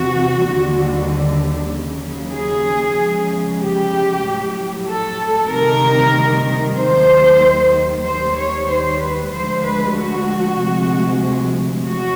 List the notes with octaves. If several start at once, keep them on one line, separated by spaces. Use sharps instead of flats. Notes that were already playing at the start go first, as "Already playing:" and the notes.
Already playing: E2 C3 E3 F#4
D#2 D3 G3
D#2 C#3 F#3
G#4
E2 C#3 F3 G#3
G4
A2 F#3
A4
D2 C3 D#3 G3 A#4
D#2 D#3 F#3 C5
D#2 D#3 G3 C5
C#5
C5
B4
D2 D3 F3 G#3 C5
B4
F#4
D2 C3 F3 G#3
E2 F#4